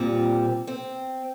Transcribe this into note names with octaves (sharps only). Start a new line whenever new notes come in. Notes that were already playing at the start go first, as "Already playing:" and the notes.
Already playing: A#2 G3 C4
C4